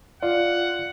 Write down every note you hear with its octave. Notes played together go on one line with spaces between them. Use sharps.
F4 D5 F#5